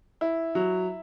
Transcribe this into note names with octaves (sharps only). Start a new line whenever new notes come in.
E4
F#3